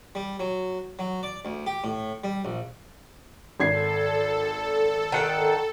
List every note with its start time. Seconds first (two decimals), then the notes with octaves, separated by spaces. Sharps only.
0.15 G3
0.39 F#3
0.99 F#3
1.23 D5
1.45 D2
1.66 G4
1.84 A2
2.24 G3
2.45 A#1
3.60 G#1 A4 G#6 C7
5.12 D#3 F#5 G5